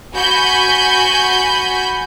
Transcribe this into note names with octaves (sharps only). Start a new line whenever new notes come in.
F#4 G#5 B5 G6